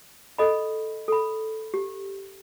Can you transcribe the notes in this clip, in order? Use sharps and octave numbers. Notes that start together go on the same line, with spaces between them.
A4 D#5 B5
A4 B5
G4